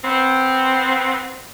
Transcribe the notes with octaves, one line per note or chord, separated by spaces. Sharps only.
B3 C4